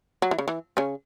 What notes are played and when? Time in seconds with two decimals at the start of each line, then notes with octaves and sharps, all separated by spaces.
0.22 F#3
0.31 E3
0.38 C#3
0.48 E3
0.77 C#3 C#4